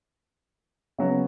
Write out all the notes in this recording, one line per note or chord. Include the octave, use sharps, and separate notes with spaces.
C#3 F#3 B3